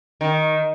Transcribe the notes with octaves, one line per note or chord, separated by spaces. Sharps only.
D#3